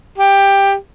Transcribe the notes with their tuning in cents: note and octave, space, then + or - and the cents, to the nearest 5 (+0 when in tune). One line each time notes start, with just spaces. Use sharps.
G4 +10